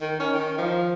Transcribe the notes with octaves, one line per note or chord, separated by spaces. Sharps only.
D#3
C#4
D#3
F3